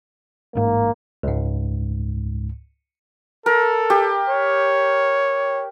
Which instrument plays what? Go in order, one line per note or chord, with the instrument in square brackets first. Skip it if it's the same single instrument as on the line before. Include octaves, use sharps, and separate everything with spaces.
[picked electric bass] A1 G#2 [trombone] A#3
[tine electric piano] C#2 G#2
[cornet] A4 [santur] A#4
[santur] G4
[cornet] C#5